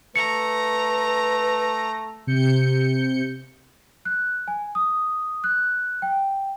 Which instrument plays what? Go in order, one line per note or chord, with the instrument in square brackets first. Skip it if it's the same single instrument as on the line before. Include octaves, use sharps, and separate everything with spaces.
[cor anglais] A3 [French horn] B4 [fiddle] A#5 [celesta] C#7
[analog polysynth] C3 G6 C#7
[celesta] F#6
G#5
D#6
F#6
G5